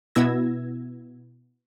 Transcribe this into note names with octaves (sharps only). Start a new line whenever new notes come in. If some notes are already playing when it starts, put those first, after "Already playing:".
B2 B3 E4 E6 G#6 A#6